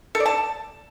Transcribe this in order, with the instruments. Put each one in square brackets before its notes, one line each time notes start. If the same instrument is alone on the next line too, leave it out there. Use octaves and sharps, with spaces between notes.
[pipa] A4
D5
A5